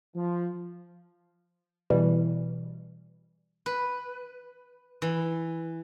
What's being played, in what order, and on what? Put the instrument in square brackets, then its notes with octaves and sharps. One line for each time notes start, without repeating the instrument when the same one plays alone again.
[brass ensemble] F3
[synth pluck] B2 E3 G3
[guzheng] B4
E3